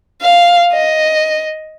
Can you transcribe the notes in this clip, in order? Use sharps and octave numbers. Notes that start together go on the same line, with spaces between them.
F5
D#5